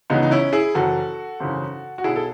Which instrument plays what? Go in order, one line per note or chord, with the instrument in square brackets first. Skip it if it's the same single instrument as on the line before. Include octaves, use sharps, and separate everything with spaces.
[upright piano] C#2 C#3 E3 B3 D#4
D#4
C#4 E4
E4 G#4
F#1 F#2 E3 F#4 A4
G#1 F#2 C#3 E3
F#4
B1 B2 E4 G#4
A4